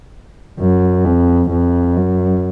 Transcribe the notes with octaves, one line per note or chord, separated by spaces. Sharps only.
F#2
F2
F2
F#2